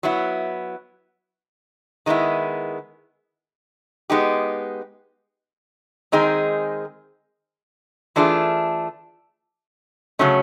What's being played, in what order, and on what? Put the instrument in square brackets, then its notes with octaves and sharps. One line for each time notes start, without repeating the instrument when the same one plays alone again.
[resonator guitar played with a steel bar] F#3 B3 E4
D#3 G#3 B3 E4
G#3 B3 D#4 G4
D#3 G#3 C4 D#4 G#4
E3 A3 D4 F4 G#4
C#3 F#3 A3 C#4